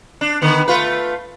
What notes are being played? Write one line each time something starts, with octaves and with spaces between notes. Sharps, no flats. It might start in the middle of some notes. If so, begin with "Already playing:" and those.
D4
D3 D#3 B3
A3 F4 B4